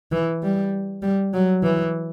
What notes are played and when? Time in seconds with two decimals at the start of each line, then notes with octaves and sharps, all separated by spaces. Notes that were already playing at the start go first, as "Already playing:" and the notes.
0.12 E3
0.43 G3
1.02 G3
1.33 F#3
1.63 E3